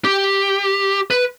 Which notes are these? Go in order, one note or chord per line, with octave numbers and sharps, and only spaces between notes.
G4
B4